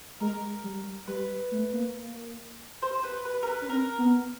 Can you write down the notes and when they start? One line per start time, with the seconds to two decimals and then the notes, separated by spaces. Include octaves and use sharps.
0.20 G#3 A#4
0.64 G3
1.07 G3 B4
1.52 A3
1.73 A#3
2.82 C5
3.03 B4
3.25 B4
3.43 A#4
3.47 B4
3.61 C#4
3.69 C4 A#4
3.98 B3